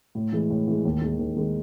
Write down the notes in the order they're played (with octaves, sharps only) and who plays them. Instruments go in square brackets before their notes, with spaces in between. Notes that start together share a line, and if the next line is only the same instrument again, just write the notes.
[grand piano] A2
E3 G#3
A2
E3 G#3
D#2
D#3 G#3
D#2
D#3 G#3